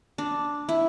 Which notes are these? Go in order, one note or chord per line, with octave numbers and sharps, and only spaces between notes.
D4
E4